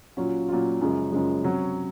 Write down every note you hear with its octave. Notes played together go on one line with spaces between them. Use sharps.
A#2 F#3 C#4 F4
A#2 F#3 C#4 F4
F#2 C#3 F3 G#3
F#2 C#3 F3 G#3
C3 F#3 C#4